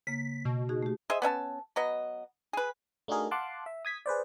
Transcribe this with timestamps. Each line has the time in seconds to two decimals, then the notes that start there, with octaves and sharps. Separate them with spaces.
0.07 C#3 A#3 B6
0.45 B2
0.69 D#4 F#4 G#4
0.83 A3 G4
1.10 G#4 C5 D#5 E5
1.22 B3 C#4 E5 A5
1.76 F#3 B3 D#5
2.53 G#4 B4
3.08 A3 D4 D#4 F#4 G#4 A#4
3.31 F5 F#5 A5 C6 D6 F#6
3.66 E5
3.85 D#6 G#6 B6
4.06 G#4 B4 C5 D5